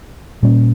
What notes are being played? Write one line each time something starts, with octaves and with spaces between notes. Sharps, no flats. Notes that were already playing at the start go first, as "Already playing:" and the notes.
A#2 G3 A#3 C#4